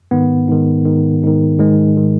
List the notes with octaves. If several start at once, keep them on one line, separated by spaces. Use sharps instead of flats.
G#2 D#3 B3
G#2 D#3
G#2 D#3
G#2 D#3
G#2 D#3 G#3
D#3